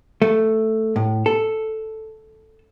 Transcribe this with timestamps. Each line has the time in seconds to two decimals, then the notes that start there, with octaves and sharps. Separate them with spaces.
0.22 A3
0.96 A2
1.26 A4